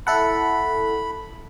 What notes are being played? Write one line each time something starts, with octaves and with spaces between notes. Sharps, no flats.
E4 A4 F#5 B5